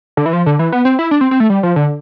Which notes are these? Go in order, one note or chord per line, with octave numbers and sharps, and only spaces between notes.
D3
E3
F3
D3
E3
B3
C4
E4
D4
C4
C4
A3
G3
F3
D3